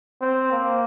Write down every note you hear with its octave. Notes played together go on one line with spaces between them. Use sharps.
C4
A#3